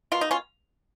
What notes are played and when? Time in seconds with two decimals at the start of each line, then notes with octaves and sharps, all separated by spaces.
0.12 B2 A#3 F4
0.21 D#4
0.31 C#4 F4